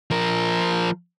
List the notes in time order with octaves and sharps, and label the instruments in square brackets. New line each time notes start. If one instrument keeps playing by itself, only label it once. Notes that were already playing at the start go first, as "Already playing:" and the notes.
[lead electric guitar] F3 A#4